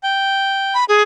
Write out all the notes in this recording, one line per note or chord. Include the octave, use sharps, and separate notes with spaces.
G5
B5
G#4